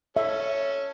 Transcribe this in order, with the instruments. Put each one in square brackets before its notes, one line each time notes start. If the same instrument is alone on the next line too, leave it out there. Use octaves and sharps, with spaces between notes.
[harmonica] C#4 A4 [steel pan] E5